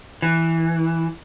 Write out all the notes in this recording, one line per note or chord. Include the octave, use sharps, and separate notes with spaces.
E3